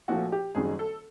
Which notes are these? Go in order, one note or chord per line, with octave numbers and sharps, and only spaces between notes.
A#1 A#2 F3 A3 F#4
G4
F#1 F#2 D#3 G3 G#4
A4